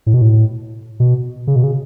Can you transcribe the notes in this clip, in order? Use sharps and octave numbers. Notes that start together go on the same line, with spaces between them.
A2
B2
A2
B2
C#3
B2
C#3